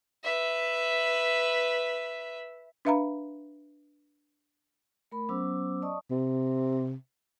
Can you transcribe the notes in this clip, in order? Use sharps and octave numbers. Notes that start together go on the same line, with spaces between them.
B4 E5
D4 B4 E5 F5 A#5 B5
A3 A#4 B5
F#3 B3 C#4 C5 D6 E6
D5 D#5 A5 C#6 D#6
C3